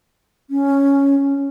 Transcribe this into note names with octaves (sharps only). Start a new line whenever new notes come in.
C#4